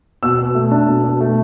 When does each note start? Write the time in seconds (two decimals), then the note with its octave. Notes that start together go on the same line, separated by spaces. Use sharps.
0.23 B2 E6
0.39 B2
0.55 A3
0.71 D4
0.87 B2
1.04 B2
1.21 A3